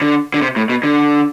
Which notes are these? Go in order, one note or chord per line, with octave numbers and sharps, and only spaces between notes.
D3
D3
C3
A2
B2
D3